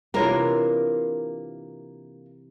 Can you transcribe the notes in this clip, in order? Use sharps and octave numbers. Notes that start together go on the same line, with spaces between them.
C3 E3 A#3 D4 F4 A#4 C#5 A#5